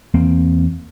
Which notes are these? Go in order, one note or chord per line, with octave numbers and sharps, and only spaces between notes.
E2 A#3 C4